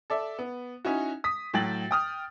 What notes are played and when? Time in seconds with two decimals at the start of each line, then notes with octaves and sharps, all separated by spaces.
0.10 A4 D5 E5
0.39 B3
0.85 C#4 D#4 E4 F#4
1.24 D#6 B6
1.54 A2 F#3 G5 A6 F#7
1.91 G5 D#6 F6